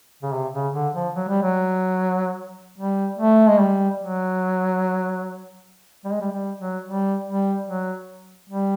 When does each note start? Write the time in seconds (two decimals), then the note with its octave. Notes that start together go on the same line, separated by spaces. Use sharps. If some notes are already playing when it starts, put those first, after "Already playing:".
0.23 C#3
0.33 C3
0.54 C#3
0.75 D3
0.94 F3
1.15 F#3
1.28 G3
1.43 F#3
2.78 G3
3.19 A3
3.49 G#3
3.60 G3
4.00 F#3
6.05 G3
6.12 G#3
6.21 G3
6.32 G3
6.59 F#3
6.86 G3
7.27 G3
7.68 F#3
8.49 G3